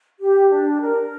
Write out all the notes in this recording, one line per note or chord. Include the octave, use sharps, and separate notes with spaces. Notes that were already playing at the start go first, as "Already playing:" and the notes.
G4
D4
A#4